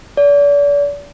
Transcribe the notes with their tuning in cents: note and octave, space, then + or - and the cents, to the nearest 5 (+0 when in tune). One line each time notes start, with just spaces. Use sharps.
D5 -40